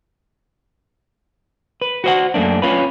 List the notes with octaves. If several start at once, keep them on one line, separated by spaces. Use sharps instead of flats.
B4
F#4 C5 F#5
F#2 A3 A#3 D4
C#4 F4 B4